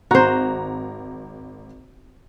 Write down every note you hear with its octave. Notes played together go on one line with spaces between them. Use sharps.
G#1 F#4 C5 A#5